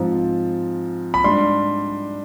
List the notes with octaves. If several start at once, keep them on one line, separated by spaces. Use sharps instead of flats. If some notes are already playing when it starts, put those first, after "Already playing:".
Already playing: G#2 F3 C4
B5
G#2 G3 D4 C6